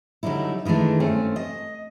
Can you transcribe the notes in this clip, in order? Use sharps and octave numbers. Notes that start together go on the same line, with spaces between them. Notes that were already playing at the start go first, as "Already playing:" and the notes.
D3 F#3 G3 D#4 E4
D#3 E3 G#3 A3 D4
G2 A3 C4 C#4 G#5
D#5